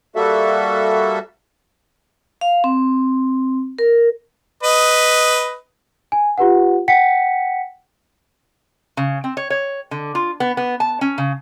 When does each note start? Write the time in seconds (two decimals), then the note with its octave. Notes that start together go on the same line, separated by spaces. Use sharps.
0.16 G3 A#3 F#4 A4 E5
2.41 F5
2.64 C4
3.79 A#4
4.63 B4 D#5
6.12 G#5
6.38 F4 G4 B4 F#5
6.88 F#5 G5 B6 C#7
8.97 C#3
9.24 C4
9.37 C#5
9.50 C#5
9.91 D3
10.15 F4
10.40 B3
10.57 B3
10.80 A5
11.01 C#4
11.18 C#3